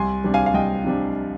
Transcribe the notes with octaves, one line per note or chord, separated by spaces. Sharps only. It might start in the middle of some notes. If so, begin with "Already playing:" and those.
Already playing: C2 G#5 C6
C3 G3 D4
F5 G#5
F5
C2 D#5 G5
C3 G3 D4